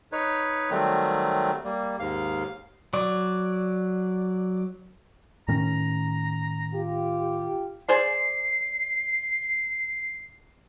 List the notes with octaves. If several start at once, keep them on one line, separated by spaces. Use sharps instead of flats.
D#4 B4 C#5
D#3 F#3 G3 A3 C4
G3 A#3
D#2 G#2 F5
F#3 D5
A2 D#3 C#4 A#5
F4 G4
G#4 C5 D5 C7